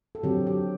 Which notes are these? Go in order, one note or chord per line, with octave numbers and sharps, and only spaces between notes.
A4
D3 F#3 C4 G4
G4